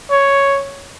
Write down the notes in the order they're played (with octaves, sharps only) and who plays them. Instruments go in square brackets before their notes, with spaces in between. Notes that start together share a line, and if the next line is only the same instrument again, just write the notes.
[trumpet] C#5